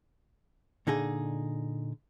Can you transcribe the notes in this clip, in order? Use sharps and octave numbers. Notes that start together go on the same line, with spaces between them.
A#2 D3 D#4 G#4